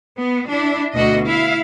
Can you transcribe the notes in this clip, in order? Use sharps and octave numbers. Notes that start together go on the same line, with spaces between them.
B3
D4 E4
D2 B2 F#4 D#5
E4 E5 F5